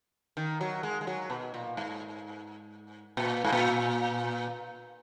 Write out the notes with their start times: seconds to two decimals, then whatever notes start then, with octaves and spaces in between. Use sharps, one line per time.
0.37 D#3
0.61 F#3
0.83 G#3
1.01 G#3
1.07 F#3
1.30 B2
1.54 A#2
1.77 G#2
3.17 A#2
3.45 G#2
3.52 A#2